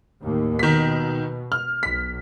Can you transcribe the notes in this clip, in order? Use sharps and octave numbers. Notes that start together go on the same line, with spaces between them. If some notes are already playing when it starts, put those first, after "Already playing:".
D#2 A2
B2 D#3 B6
F6
B1 B6